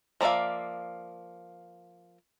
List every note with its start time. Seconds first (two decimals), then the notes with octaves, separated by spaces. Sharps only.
0.21 F3 A#3 D5 E5 F5